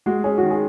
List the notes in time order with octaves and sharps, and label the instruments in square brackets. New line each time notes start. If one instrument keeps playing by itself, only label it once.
[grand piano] G#3 [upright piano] F#4
[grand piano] C#4 [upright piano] G#4
[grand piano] D#3 [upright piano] F#4
[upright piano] G#4